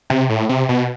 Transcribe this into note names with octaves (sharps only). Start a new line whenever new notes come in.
C3
A2
C3
B2